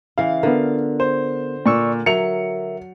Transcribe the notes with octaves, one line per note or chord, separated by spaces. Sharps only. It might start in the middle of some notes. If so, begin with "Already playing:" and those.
C#3 E3 F5
D3 B3 F4 A#4
C5
A#2 D5 C#6 E6
F#3 A#4 E5 C#7 F7